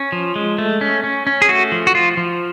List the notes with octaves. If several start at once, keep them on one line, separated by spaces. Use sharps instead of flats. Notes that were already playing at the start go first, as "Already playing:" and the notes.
Already playing: C#4
F3
G#3
A3
C#4
C#4
C#4
G#4
A3 F#4
F3
F#4
F3 F4
F3